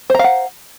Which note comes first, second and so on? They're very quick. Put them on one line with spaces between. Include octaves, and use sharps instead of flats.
C5 A#5 F5 F#5